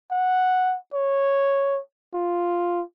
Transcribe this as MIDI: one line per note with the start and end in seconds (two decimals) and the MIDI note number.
0.11 0.76 78
0.94 1.80 73
2.14 2.83 65